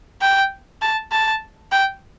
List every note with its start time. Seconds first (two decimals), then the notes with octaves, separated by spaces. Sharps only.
0.21 G5
0.82 A5
1.12 A5
1.72 G5